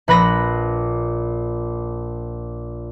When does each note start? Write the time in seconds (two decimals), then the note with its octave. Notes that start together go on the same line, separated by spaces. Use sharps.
0.08 A#1 B4 B5 A#6